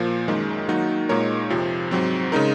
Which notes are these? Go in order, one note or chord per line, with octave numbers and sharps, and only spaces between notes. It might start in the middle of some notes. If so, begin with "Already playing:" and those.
Already playing: A#2 F3 A#3
F#2 D#3 G#3
D#3 F#3 A#3 D#4 F#4
A#2 G#3 D#4 A#4 C#5
F2 C3 F3
G#2 F#3 C4
C#3 G#3 D#4 A#4